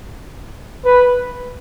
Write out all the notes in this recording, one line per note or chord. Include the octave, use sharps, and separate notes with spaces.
B4